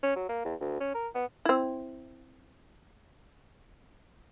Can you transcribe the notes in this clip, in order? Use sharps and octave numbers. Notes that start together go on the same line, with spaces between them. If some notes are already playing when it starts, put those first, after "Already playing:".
C#4
F#3
A#3
E2
D2
C#4
A#4
B3
C4 E4